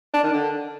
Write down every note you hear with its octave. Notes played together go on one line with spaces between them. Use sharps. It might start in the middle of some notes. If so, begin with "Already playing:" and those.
D4
D#3
D3